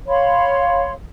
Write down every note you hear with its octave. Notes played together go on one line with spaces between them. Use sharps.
C#5 F5 B5 C6